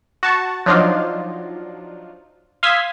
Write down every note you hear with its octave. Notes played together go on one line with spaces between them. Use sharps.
F#4 A5 C#6
F3 F#3 D4 D#4 F4
F5 C6 D#6 E6 G#6 B6